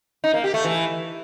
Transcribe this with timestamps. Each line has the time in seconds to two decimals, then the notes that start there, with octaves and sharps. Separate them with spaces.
0.24 D#4
0.34 A#3
0.44 G4
0.54 A3
0.64 E3